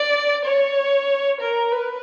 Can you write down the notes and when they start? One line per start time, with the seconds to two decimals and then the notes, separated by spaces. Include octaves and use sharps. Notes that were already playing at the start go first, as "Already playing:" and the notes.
Already playing: D5
0.44 C#5
1.41 A#4
1.72 B4